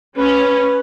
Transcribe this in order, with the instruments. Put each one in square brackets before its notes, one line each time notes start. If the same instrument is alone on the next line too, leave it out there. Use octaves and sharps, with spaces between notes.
[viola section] C#4 [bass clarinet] B4